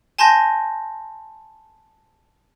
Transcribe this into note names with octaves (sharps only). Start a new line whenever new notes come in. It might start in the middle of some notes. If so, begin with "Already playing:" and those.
G#5 A5 C6 G6 A#6